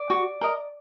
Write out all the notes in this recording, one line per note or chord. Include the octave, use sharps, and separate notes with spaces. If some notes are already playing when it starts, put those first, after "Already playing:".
Already playing: D5
F#4
A#4 D#5